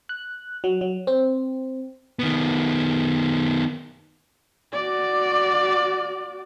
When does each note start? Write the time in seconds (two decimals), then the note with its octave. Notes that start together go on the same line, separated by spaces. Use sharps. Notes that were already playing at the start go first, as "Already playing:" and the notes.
0.09 F#6
0.64 F#3
0.81 F#3
1.07 C4
2.19 D#3 B3
4.72 F#4 D5